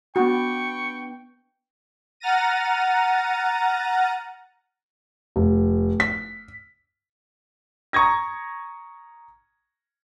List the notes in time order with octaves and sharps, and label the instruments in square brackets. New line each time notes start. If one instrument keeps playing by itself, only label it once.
[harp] B3 D4 [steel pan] F#4 [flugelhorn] G5 [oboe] C#6
[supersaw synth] F#5 A#5 F6 A6 A#6 D#7
[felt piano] F1
B6
[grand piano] A#5 C#6 D#6 G#6 A#6